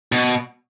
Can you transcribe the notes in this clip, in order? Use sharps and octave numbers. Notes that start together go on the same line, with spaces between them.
B2